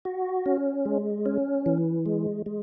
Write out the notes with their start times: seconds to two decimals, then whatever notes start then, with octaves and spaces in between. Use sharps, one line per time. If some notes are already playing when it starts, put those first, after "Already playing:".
0.05 F#4
0.46 C#4
0.85 G#3
1.26 C#4
1.66 E3
2.06 G#3
2.46 G#3